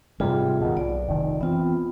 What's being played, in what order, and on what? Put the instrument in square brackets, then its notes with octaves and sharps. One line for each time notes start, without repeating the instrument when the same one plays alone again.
[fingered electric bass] G#2 C3 G3 [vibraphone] F4 G#4
[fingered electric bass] D#2 B2
[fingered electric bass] B1 [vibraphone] D5
[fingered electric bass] F1 D#3
[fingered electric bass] E3 C4 [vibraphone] B3 F4